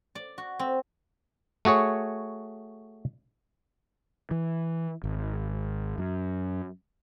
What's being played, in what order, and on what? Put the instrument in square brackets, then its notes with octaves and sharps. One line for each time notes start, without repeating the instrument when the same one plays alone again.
[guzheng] D5
F#4
C4
[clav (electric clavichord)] A3 F#4 G#4 C#5
[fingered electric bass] E3
G#1
F#2